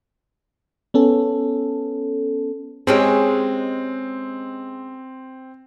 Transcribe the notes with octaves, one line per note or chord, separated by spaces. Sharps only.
B3 C#4 A4
G#3 C4 C#4 G4